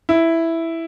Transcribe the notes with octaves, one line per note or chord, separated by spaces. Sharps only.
E4